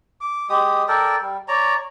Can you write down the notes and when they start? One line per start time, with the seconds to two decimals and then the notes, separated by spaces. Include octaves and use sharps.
0.21 D6
0.49 G#3 G4 D#6
0.88 A4 A#4 D5 G5
1.21 G3
1.48 C#5 D5 A#5